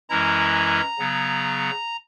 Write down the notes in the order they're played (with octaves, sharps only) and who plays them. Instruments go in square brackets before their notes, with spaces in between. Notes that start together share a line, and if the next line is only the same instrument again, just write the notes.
[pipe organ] F#2 E3 G#3 C#4 E4 A#5
C#3 F#3 B3